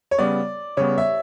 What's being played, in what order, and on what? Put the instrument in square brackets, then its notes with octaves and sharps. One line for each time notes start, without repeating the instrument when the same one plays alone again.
[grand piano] C#5
[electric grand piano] C#3 G3 B3 [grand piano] D5
[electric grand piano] C#3 G3 B3 [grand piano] C#5
[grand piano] E5